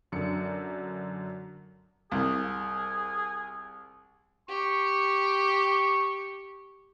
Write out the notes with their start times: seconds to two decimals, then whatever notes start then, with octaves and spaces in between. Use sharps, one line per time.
0.12 F#2 D3 C#7
2.12 C2 G#4
4.48 G4 C#6